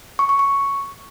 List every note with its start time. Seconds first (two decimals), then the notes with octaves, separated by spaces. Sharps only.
0.19 C#6
0.29 C#6
0.39 C#6